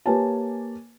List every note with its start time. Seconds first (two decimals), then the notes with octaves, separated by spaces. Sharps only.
0.06 A#3 G4 B4 C#5 G#5 A5